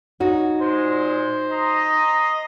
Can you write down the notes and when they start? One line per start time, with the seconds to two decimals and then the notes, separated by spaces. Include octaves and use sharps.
0.20 D#4 F#4 C#5
0.61 A#2 G#3 C5
1.51 D#5 A#5 C6